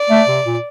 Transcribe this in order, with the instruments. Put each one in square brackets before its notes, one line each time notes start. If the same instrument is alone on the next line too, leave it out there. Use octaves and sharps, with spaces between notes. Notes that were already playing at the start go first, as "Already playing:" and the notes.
Already playing: [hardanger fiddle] D5
[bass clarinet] A3
C3
A#2